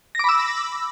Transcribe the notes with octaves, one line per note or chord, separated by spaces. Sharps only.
B5 D6 E6 A#6